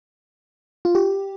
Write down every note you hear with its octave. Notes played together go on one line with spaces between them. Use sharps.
F4
G4